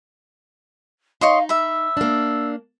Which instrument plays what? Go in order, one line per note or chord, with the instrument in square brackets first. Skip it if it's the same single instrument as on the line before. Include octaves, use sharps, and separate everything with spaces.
[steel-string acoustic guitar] D#4 [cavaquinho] C#5 D#5 C6 [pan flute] F5
[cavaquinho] E5 B5 [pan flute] E6
[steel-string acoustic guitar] A#3 D4